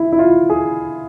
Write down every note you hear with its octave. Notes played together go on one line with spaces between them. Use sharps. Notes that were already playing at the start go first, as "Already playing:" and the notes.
Already playing: E4
E4
F4
G#4